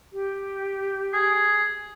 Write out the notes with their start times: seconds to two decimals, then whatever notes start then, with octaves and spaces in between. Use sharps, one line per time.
0.12 G4
1.13 G#4